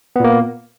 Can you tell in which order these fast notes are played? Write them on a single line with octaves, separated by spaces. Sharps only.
B3 A#2 A#3